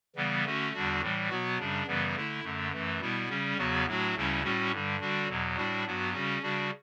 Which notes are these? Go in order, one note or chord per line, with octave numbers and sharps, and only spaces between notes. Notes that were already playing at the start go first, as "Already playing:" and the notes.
C#3 E3 G3 B3
D3 A3 C#4 F#4
E2 D3 G3 D4 F#4
A2 E3 G3
B2 F#3 B3 F#4
F#2 C#3 G3 D4
F#2 C#3 E3 G3 B3
D3 A3 E4
F#2 D3 A3
F#2 E3 A3
B2 G3 B3 E4
C#3 G3 C#4
E2 C#3 F#3 B3 F#4
A2 F#3 A3 D4 F#4
D2 C#3 G3 C#4 E4
A2 G3 C#4 F#4
G2 D3 G3
D3 G3 D4 F#4
E2 B2 F#3
A2 G3 D4 F#4
G2 F#3 B3 F#4
C#3 G3 C#4 F#4
C#3 G3 D4 F#4